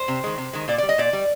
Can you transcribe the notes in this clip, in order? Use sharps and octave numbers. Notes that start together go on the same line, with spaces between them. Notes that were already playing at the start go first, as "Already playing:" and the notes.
Already playing: C5
C3
D#3 G#3
C3
D#3 G#3
A#2 D5
G3 D5
D#5
A#2 D5
G3